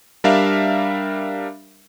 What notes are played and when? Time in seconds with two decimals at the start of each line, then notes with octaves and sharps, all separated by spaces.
0.24 G3 D4 A#4 E5 F5